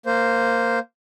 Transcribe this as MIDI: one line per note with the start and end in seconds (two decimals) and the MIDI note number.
0.06 0.79 58
0.06 0.79 72